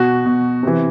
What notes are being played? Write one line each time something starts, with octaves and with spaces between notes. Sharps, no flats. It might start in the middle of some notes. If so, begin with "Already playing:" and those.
Already playing: B2 F#4
B2
C3 E3